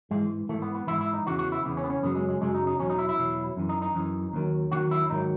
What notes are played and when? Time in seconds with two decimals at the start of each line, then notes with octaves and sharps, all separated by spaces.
0.11 G#2 E3 G#3
0.49 E3 A3
0.53 G#2
0.62 B3
0.75 B3
0.87 G#2 E3 E4
1.01 E4
1.14 D#4
1.26 E2 C#3 E3 F#4
1.39 F#4
1.52 E4
1.65 E2 C#3 E3 B3
1.77 C#4
1.84 B3
1.90 C#4
2.02 F#2 C#3 F#3 B3
2.15 G#3
2.29 G#3
2.41 F#2 C#3 F#3 G#3
2.55 D#4
2.67 D#4
2.79 E2 B2 F#3 C#4
2.90 D#4
2.99 E4
3.09 E4
3.18 E2 B2 F#3
3.56 F#2 E3
3.69 D#4
3.82 D#4
3.95 F#2 E3
4.33 D#2 D#3 F#3
4.72 D#2 D#3 F#3 F#4
4.91 E4
5.10 G#2 D#3 F#3 D#4